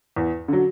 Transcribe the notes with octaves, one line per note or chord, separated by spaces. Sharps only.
E2
D3 F#3